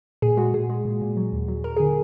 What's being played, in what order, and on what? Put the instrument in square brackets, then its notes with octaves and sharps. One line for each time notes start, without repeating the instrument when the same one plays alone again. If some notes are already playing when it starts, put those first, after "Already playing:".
[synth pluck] A#2 G#4
G#3 F#4
A#2 G#4
G#3
A#2
A#2
F#3
D#2
F#3
D#2 A#4
D3 G#4